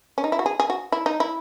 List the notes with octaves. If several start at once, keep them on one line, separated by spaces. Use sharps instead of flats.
C#4
D#4
E4
F#4
G#4
G#4
F#4
E4
D#4
E4